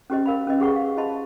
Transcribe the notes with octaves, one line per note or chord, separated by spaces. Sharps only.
C#4 F#4 G4 C5 D#5
A#4 F5 B5
C#4 B4 D#5
G4 G#4 F#5 C#6
F5
F4 C5 D#5 A5 B5 C6